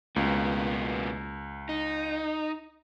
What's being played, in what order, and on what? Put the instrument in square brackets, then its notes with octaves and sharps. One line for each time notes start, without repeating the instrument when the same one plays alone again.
[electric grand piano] C#2 [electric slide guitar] B2 A#3 B3
[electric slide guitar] D#4